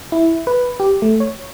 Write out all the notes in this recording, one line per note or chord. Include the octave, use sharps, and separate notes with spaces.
E4
B4
G4
A3
C#5